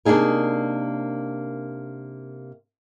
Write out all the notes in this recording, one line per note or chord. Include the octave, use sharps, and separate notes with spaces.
C3 A#3 D4 D#4 G#4 A#4